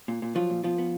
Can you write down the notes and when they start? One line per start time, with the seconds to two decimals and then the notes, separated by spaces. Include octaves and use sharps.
0.08 A#2
0.22 A#2
0.35 F3 F#3 F4
0.50 A#2
0.64 F3 B3 F4
0.78 B3